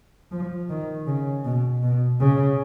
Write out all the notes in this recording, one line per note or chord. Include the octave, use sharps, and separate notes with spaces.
F3
D#3
C#3
B2
B2
C#3